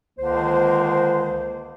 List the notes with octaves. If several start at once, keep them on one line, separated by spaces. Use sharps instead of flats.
C#2 D3 D#3 A#3 C5